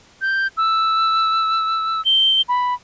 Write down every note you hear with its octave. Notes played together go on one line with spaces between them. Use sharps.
G6
E6
G7
B5